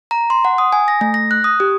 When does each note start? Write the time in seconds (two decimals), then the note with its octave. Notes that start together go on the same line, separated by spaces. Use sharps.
0.11 A#5
0.30 C6
0.45 F#5
0.58 D#6
0.73 G#5
0.88 A#6
1.01 A3
1.14 A#6
1.31 F#6
1.44 D#6
1.60 G4